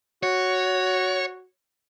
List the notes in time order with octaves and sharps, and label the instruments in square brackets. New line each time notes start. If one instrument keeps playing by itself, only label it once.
[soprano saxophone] F#4 [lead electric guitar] C#5